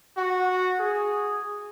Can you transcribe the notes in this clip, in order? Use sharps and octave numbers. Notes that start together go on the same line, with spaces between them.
F#4
G#4